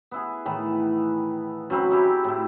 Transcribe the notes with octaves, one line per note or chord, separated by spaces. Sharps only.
B3 E4 G#4
A2 D#3 E3
F#2 F#3 C4 B5
D#4 E4 G4 G#4
A2 E4